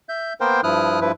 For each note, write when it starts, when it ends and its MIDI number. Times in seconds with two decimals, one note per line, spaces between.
0.09 0.33 76
0.09 0.33 91
0.41 0.61 58
0.41 0.61 59
0.41 0.61 70
0.41 0.61 72
0.41 0.61 79
0.64 1.00 43
0.64 1.00 53
0.64 1.00 64
0.64 1.00 87
0.64 1.00 89
0.64 1.00 90
1.01 1.12 43
1.01 1.12 53
1.01 1.12 64
1.01 1.12 71